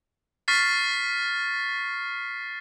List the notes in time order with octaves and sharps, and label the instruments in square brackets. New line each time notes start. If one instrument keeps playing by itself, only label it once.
[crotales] C#6 F6 A6 B6 C7